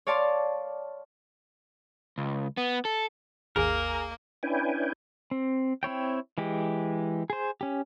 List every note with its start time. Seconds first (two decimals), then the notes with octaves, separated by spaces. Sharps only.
0.07 C#5 D5 F5 A5 C6 D6
2.18 C#2
2.57 B3
2.85 A4
3.56 G#1 D#2 A#3 G#4 A#4
4.43 C#4 D4 E4 B4 G5 G#5
5.31 C4
5.83 C4 E4 C#5 G5
6.38 E3 G#3 G4
7.30 G#4 C5
7.61 C#4 G4